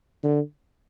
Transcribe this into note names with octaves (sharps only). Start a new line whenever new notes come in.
D3